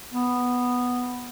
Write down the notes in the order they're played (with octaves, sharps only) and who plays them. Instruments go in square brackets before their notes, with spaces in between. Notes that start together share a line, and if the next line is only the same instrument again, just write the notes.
[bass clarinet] B3